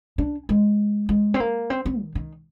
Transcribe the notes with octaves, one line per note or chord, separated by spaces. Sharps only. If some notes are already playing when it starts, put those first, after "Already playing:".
D4
G#3
G#3
C4
A#3
C4
C4
D#3
D#3